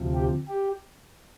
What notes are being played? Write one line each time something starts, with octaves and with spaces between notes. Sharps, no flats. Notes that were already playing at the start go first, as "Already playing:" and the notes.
Already playing: D2 C3 F3
G4
G4